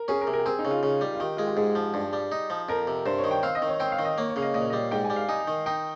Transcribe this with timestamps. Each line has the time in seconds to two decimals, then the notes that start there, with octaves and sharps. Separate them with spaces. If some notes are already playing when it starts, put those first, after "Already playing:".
Already playing: A#4
0.08 C#4 G#4
0.21 A#4
0.27 C3
0.33 A#4
0.39 G4
0.46 C4 G#4
0.59 D#4
0.65 C#3
0.71 F4
0.83 C#3
1.01 G3
1.15 F4
1.20 D#3 G4
1.37 G#3 F4
1.48 G4
1.57 G#2 G#4
1.75 F3
1.94 G2
2.13 G3
2.32 D#4
2.50 F3
2.69 F2 A#4
2.87 C3
3.06 G2 C5
3.18 C#5
3.24 D#3
3.31 G5
3.43 C4 F5
3.55 D#5
3.62 D#3
3.68 C#5
3.80 C4 G5
3.92 F5
3.99 D#3
4.05 D#5
4.17 A#3 C#5
4.30 C#5
4.36 C#3 F5
4.42 D#5
4.54 A#2 D#5
4.62 C#5
4.70 G3 D#5
4.91 G#2 G5
5.05 G#5
5.10 G3
5.16 F5
5.28 D#4 G#5
5.48 D#3
5.66 D#4 G5